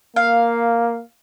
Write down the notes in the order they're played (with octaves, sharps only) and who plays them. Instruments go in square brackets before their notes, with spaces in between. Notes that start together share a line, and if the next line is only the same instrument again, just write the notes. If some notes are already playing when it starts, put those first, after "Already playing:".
[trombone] A#3 [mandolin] F5